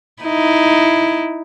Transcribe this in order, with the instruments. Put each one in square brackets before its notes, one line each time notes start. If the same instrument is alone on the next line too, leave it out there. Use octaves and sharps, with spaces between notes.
[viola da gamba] D#4 E4